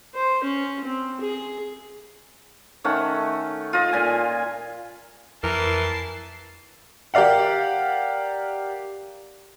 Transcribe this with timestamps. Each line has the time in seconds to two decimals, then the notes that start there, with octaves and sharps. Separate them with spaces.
0.14 C5
0.43 C#4
0.84 C4
1.20 G#4
2.84 D#3 A3 C#4 F#5
3.73 F4 D#5
3.92 A#2 G#5
5.44 F2 E3 A#4 A5 C7
7.14 G4 A#4 D5 F5 F#5